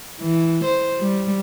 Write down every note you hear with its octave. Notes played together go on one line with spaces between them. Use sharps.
E3
C5
G3